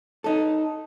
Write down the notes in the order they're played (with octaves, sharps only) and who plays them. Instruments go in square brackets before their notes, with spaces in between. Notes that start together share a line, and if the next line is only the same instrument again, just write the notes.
[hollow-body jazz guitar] D#4 A4